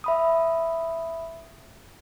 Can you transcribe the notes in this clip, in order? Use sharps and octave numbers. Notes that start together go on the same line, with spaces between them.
E5 B5 D#6